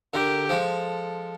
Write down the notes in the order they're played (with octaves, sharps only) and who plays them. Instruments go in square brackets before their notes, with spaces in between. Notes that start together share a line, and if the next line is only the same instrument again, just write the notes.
[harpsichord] D3 [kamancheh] G4 A#4
[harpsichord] F3 G#3 [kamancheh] A4